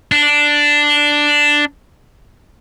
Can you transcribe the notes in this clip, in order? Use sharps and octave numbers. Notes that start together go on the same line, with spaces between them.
D4